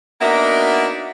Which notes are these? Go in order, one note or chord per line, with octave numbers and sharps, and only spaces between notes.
A#3 B3 D4 D#4 F#4 E5